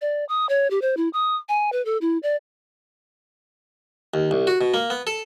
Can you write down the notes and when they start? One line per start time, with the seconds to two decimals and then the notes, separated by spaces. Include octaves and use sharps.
0.02 D5
0.29 D#6
0.49 C#5
0.71 G4
0.82 C5
0.97 E4
1.13 D#6
1.49 G#5
1.72 B4
1.85 A4
2.01 E4
2.23 D5
4.14 D#2
4.31 C2
4.47 F#4
4.61 B2
4.74 A#3
4.90 B3
5.07 A4